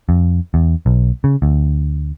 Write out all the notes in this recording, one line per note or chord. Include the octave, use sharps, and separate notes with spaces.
F2
E2
B1
C#3
D2